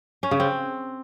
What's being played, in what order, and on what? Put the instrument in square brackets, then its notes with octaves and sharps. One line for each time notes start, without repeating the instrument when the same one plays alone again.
[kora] C#4
C#3
C4